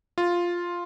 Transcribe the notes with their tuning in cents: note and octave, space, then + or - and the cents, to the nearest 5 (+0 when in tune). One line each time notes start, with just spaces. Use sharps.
F4 +0